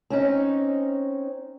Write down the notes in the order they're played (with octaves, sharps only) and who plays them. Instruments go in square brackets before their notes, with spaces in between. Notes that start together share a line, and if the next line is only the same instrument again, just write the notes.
[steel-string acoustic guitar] C4 C#4 D#4